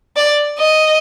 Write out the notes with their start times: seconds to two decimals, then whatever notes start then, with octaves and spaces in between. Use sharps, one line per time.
0.17 D5
0.59 D#5